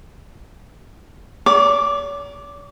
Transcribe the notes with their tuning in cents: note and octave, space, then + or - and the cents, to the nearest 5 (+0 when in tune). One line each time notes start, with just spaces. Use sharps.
C#5 +45 D6 +0